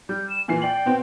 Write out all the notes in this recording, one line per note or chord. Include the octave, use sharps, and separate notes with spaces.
G3 G6
E7
A#2 E3 G#5 C7
D5 G5 F#7
B2 B3 C4